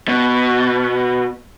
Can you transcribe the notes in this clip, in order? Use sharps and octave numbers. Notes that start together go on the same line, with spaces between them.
B2